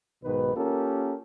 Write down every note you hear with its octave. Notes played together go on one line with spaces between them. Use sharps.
B1 G#2 B2 D#3 B4
A#3 C#4 F4 G4 A4 A#4